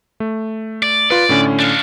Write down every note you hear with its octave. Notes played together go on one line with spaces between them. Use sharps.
A3
D5
F4 B4 D5
A2 D3 C#4
D4 F5